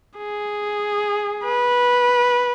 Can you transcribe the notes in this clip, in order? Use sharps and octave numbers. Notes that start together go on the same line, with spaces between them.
G#4
B4